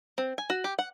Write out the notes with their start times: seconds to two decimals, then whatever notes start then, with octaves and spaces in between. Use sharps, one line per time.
0.18 C4
0.38 G#5
0.50 F#4
0.64 G4
0.79 F#5